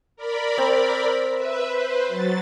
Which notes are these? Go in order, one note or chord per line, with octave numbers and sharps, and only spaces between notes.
A#4 D5 B5
C4
B4 E5
B4 C5
F#3 A6